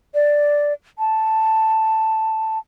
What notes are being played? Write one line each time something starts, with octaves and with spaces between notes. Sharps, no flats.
D5
A5